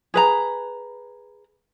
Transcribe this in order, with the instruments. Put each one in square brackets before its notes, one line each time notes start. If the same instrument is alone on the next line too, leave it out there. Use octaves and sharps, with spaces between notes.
[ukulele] G#4 B4 A#5